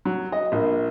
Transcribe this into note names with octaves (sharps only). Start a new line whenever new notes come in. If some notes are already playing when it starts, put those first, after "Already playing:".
F#3
D#5
A#1